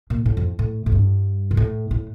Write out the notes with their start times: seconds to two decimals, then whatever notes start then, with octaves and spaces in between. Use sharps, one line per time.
0.10 A#2
0.26 A2
0.37 F2
0.59 A2
0.86 A2
0.92 G2
1.51 A#2
1.57 A2
1.91 A2